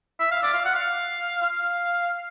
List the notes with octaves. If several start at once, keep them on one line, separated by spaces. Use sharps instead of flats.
E5
F5
D5
F5
F#5
F5
F5